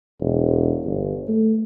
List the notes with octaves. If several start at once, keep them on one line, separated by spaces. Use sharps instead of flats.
E1
G1
A3